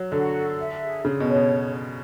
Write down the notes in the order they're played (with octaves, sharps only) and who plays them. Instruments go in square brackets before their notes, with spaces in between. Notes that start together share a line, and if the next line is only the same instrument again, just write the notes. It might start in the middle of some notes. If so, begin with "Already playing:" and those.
Already playing: [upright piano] F#3
[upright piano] D3 [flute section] F#4
[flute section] A4
E5
G#4
[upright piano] C#3 [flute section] G#4
[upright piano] B2
[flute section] C#5
[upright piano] B2